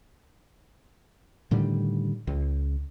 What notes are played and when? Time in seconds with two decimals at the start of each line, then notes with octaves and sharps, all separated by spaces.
1.51 A2 D3 D#3 G3
2.27 C#2